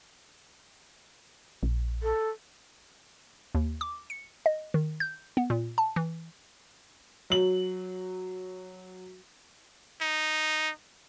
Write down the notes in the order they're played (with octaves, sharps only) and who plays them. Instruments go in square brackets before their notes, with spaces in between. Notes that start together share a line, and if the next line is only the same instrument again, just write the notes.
[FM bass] A#1
[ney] A4
[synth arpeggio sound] D#2
D6
C#7
D#5
D#3
G6
B3
A#2
A5
E3
[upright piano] F#3 F#7
[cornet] D#4